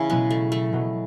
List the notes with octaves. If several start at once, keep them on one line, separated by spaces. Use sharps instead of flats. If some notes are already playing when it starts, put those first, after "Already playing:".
Already playing: C#3 E3 C#4 E4
B2 F#3 G#3 B3
A3
A3
B2 F#3 B3